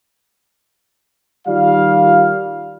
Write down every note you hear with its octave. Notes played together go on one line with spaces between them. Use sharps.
D#3 G3 F4 F5